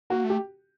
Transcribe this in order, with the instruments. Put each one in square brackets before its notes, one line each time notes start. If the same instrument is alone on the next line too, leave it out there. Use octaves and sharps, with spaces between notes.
[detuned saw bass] A#3 [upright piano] F#4
[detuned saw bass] A3
[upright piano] G4